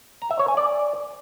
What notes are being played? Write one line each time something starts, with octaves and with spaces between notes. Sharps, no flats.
A#5
E5
C#5
G#5
D5